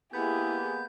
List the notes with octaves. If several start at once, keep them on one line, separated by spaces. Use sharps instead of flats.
G#3 A#3 B3 E4 G4 G#4 G6